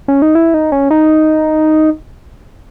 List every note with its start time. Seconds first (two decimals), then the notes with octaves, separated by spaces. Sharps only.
0.08 C#4
0.22 D#4
0.35 E4
0.54 D#4
0.72 C#4
0.90 D#4